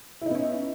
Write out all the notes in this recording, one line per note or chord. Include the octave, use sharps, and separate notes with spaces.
B3 C#4 D#4 E4